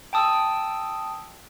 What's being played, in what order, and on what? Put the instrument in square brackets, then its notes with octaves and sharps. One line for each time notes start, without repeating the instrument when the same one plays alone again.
[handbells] G5 A5 D#6 E6